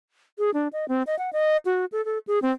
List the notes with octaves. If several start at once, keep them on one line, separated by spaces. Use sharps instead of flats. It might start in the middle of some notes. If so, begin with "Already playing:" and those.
G#4
D4
D#5
C4
D#5
F#5
D#5
F#4
A4
A4
G#4
C4